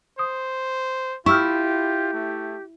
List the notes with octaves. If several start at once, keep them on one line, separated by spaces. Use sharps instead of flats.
C5 D#6
E4 F4 G4 C#6 E6 F6
A3